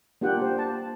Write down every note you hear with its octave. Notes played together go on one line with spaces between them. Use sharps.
A#3 D4 F4 G4 F#5 G5
G4 C5
A5